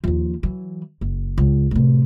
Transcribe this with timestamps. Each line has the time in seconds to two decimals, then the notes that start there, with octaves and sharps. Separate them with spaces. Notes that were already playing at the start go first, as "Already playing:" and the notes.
0.04 D#2 F3
0.43 E3 F#3
1.01 F#1
1.38 C#2
1.71 A2 C3